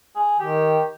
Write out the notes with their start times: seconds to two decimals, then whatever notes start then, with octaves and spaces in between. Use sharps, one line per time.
0.16 G#4
0.40 D#3 G4